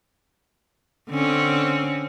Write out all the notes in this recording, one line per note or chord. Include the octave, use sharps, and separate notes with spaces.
D3 C4 C#4